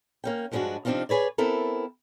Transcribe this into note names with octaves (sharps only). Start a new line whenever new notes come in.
A#3 C#4 G5
G2 F3 G#3 C4 D4 F#4
C3 F3 C4 D4 D#4 F4
G#4 B4 C#5 D5
B3 C4 E4 A4 A#4